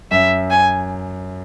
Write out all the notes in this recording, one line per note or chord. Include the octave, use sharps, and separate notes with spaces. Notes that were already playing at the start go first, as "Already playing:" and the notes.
F#2 E5
G#5